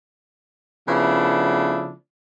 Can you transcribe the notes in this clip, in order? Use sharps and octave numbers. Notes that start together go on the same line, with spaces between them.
C#3 F3 A3 B3 D4 E4